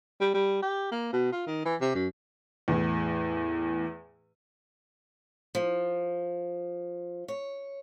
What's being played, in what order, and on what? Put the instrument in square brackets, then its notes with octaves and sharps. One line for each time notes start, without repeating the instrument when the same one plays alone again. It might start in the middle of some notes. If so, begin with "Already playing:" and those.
[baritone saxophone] G3
G3
G4
A#3
B2
F4
D#3
E3
C3
F#2
[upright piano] E2 A2
[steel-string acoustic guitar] F3
C#5